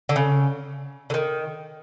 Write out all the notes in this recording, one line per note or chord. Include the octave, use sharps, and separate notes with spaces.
D3
C#3
D3
D#3